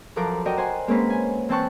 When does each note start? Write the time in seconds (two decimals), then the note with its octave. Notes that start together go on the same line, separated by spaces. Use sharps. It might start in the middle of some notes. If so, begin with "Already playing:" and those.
0.16 F#2 F3 A4 A#4 D6 F#6
0.45 F#4 A#4 D5 D#5 G5
0.57 C5 F#5 G#5
0.88 G#3 A#3 C4 C#4 B4
1.10 G#5
1.49 E3 C4 G5 A5 C#6 F#6